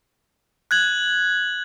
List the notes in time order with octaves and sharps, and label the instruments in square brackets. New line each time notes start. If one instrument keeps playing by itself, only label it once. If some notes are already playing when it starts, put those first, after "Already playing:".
[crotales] F#6 G#6 F#7